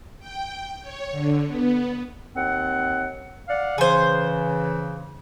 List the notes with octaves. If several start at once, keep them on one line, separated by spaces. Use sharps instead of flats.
G5
C#5
D3
B3
D#2 C4 F#5
D5 F5 F#5
C#3 E3 G#4 C5